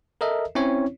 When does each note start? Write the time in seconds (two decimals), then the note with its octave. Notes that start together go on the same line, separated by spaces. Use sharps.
0.21 A4 A#4 D#5 E5
0.55 C4 C#4 E4 C#5